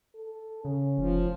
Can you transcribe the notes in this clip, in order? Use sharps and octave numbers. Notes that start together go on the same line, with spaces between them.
A4
C#3 C#4
F1 F3